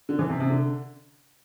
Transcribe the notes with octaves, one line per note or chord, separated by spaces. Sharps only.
D3
E3
C3
C3
D3